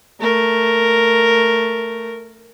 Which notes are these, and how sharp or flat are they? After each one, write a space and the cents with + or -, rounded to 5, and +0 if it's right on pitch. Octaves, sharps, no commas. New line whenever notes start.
A3 +10 A#4 +0